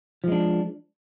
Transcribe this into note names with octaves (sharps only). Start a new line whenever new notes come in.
F3 G#3 D4